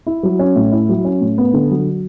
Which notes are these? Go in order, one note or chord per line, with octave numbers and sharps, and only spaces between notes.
E4
F#3
C#4
A2
E4
F#3
C#4
A2
B3
D3
F#3